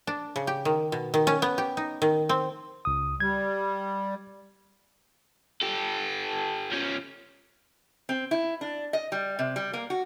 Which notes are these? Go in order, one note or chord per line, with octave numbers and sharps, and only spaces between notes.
D4
C#3
G4
D#3
B2
D#3
C#4
B3
G4
D#4
D#3
C4
C#2 D#6
G3 G#6
G4 A4
F3 C#4
C4
E4
D4
D#5
G3
C3
G3
A#3
F#4